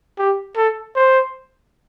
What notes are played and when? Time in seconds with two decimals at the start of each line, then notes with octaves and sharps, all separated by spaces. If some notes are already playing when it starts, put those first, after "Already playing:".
0.18 G4
0.57 A4
0.96 C5